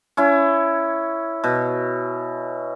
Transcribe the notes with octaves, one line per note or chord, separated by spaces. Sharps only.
C#4 E4
B2